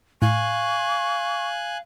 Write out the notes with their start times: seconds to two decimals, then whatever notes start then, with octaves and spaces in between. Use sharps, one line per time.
0.22 A2 F5 G#5 C#6 F#6